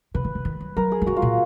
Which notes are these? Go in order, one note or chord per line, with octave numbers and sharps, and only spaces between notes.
C#3 B4
D#3
C#3
D#3
F#3
F#3 A#4
G#4
F3
F#3 F#4
F4
A#2